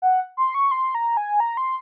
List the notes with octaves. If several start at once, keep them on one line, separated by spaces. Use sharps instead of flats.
F#5
C6
C#6
C6
A#5
G#5
A#5
C6